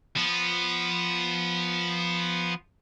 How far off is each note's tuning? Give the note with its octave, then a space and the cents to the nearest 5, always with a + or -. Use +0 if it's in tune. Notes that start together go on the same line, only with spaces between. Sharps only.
F3 +0 B3 +0